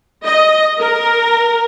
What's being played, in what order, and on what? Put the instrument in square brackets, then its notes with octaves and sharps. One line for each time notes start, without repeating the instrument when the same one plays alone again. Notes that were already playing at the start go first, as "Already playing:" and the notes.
[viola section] D#5
A#4